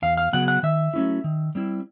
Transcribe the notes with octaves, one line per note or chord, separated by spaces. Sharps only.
E2 F5
F5
C#3 F#3 B3 F#5
F#5
D#3 E5
F#3 A3 C#4 E4
D#3
G3 C4 E4